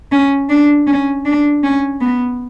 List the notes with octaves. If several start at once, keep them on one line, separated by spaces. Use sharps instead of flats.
C#4
D4
C#4
D4
C#4
B3